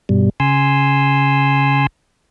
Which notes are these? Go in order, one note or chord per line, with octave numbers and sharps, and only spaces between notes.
G2 B2 G3
C#3 G#5 C6 E6